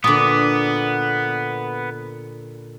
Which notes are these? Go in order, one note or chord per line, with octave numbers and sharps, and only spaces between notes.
A#2 D3 B3 D#6